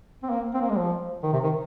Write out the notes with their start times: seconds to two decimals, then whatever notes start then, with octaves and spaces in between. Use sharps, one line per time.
0.23 C4
0.30 A#3
0.54 C4
0.61 A#3
0.69 G#3
0.77 F3
1.23 D#3
1.33 C3
1.43 D#3